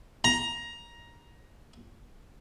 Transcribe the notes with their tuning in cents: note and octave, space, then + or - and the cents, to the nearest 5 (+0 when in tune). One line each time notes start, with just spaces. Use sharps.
A#5 +15